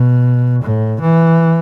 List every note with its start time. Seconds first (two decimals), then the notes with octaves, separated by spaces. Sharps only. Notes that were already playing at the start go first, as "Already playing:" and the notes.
Already playing: B2
0.63 A2
1.00 E3